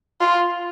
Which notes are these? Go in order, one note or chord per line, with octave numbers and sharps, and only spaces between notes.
F4